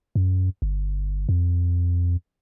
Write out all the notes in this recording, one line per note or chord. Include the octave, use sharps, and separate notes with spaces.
F#2
G1
F2